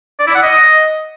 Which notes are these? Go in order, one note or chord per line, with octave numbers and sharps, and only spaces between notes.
D5
E4
F#5
D#5